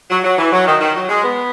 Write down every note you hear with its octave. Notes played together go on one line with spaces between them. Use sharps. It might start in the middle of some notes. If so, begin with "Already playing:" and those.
F#3
F#3
E3
F#3
D#3
D#3
F#3
G#3
B3